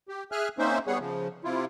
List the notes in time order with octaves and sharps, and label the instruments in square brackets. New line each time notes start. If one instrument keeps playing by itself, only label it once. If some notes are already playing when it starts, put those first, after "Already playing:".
[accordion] G4
G#4 E5 G#5 F6 F#6
A#3 C4 C#4 D#4 C5 E5
G3 B3 G#4 C#5 F#5
C#3 F3
C3 E4 F4